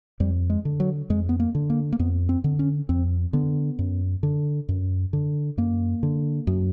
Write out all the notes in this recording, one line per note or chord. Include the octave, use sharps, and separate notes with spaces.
F2 G3
G#3
D3
F#3
F2 G#3
B3
A#3
D3
A#3
A#3
F2 B3
C4
D3
C#4
F2 C4
D3 B3
F#2
D3
F#2
D3
F#2 A#3
D3
F#2